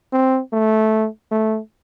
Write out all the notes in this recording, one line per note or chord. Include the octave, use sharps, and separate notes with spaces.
C4
A3
A3